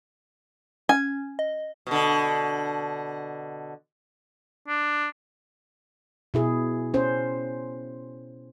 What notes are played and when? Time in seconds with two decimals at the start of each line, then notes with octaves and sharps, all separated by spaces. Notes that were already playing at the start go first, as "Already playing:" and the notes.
0.89 C#4 G#5
1.39 D#5
1.87 B2 D3
4.69 D4
6.34 B2 E4 G#4
6.94 C#4 C5